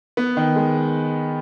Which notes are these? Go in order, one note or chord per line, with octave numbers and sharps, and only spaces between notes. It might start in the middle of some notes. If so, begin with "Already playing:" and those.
B3
D#3
G#3